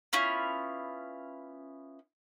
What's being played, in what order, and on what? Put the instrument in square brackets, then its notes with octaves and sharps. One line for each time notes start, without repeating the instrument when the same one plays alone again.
[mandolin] B3 C#4 E4 F4